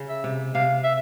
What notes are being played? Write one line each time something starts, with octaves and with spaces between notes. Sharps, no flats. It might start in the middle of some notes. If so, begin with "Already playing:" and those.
Already playing: C#3
E5
C3
C3 F5
E5